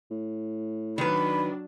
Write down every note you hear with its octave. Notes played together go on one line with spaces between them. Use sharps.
A2
D#3 F#3 D4 B4 B5